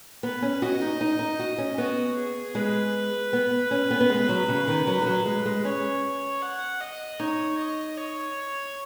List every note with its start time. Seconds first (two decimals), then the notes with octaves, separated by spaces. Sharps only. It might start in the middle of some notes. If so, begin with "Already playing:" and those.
0.23 B3 B4
0.42 C#4
0.62 F#4 D#5
0.81 D#4
1.01 D#4
1.19 D#4
1.39 F#4
1.58 C#4
1.78 B3 F#4
2.16 G#4
2.55 G#3 B4
3.33 B3
3.71 C#4
3.91 B3
4.01 B3
4.10 G#3
4.29 F#3
4.49 C#3
4.68 D#3
4.87 F#3
5.02 D#3
5.06 F#3
5.26 G#3
5.46 G#3
5.65 C#4 C#5
6.42 F#5
6.81 D#5
7.20 D#4 C#5
7.58 D#5
7.97 C#5